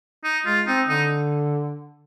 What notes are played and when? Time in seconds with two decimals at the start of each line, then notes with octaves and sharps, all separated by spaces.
0.24 D#4
0.46 G#3 F4
0.67 C4 D#4
0.88 D3 D#4